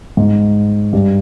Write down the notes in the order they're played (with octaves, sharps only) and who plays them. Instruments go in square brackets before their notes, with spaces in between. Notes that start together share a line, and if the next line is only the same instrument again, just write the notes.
[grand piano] G#2
G2